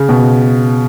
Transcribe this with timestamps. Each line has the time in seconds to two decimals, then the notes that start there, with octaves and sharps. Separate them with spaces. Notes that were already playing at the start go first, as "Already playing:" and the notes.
Already playing: C#3
0.09 B2